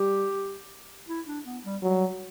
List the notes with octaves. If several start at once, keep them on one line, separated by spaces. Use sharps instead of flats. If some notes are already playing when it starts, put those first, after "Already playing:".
Already playing: G3 G4
E4
D4
B3
G3
F#3 G3